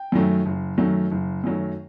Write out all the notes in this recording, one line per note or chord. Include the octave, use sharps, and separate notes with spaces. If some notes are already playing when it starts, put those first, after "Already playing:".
Already playing: G5
F#2 D#3 F#3 A3
F#1
F#2 D#3 F#3 A3
F#1
F#2 D#3 F#3 A3